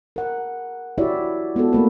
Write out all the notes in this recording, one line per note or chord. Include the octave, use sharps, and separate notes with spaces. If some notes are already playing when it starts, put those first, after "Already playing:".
A#4 F#5
E4 F#4 G4 C#5 D5 E5
G#3 B3 F4 F#4 A4
A3 A#3 B4